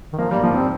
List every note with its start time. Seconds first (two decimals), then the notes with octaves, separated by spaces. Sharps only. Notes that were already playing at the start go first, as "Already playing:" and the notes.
0.13 D#3
0.18 F3 A#3
0.31 G3 A#3
0.43 F3 A#3
0.55 G3 C4